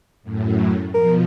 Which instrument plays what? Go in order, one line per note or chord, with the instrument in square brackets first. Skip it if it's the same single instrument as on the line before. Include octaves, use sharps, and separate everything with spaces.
[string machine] F#2 A2
[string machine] B2 F3 [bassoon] A#4